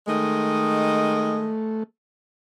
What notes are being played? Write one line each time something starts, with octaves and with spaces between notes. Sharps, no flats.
D#3 G#3 A3 D#5